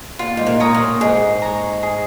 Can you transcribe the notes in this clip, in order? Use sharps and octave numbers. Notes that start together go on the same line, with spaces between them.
A#2 F4
G#2
A#2
C#5 A#5 D#6
A#2
G#2 G#4
C#5 A#5
G#4